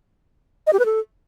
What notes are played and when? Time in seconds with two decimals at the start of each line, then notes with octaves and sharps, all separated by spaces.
0.67 D#5
0.73 G4
0.79 B4
0.85 A4